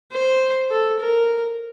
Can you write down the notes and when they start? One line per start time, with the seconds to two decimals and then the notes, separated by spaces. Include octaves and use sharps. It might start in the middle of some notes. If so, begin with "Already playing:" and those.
0.12 C5
0.71 A4
0.99 A#4